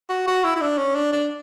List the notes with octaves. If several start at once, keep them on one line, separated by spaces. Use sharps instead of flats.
F#4
F#4
E4
E4
D4
C#4
D4
D4